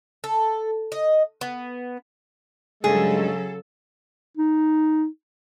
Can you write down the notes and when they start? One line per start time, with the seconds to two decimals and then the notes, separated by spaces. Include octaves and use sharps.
0.24 A4
0.92 D#5
1.41 B3
2.84 G2 C#3 F#3 G#3 G#4 A4
4.37 D#4